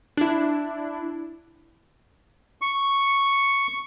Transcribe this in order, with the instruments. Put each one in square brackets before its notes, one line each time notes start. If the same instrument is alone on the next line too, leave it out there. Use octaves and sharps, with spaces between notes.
[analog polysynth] D4 E4
[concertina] C#6